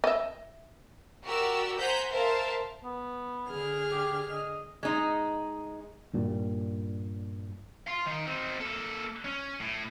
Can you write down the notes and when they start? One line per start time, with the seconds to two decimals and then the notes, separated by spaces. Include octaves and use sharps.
0.04 D#5 E5
1.24 F#4 G4 A#4 D5 E6
1.78 C5 F#5 G#5 A#5 G6 B6
2.10 A#4 C5 E5 F5 A5
2.84 B3
3.48 D3 G#4 F6
3.92 G4
4.31 D#5
4.83 G#3 D#4
6.14 G2 A#2 G3
7.87 F5 C6
8.06 D#3 D#4
8.27 C4 D#4
8.61 A#3 A4
9.24 C#4
9.60 A2